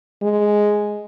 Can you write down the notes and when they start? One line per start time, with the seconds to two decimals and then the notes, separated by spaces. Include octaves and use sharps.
0.22 G#3